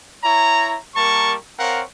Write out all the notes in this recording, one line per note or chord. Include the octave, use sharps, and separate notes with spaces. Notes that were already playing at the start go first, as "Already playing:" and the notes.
E4 C#5 A#5
G3 A#3 A#4 A5 C#6
C4 A#4 C#5 F5 F#5